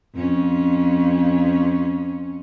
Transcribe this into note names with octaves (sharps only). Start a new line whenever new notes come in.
F2 C#4